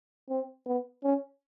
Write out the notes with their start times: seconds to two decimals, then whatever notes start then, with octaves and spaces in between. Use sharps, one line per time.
0.30 C4
0.66 B3
1.03 C#4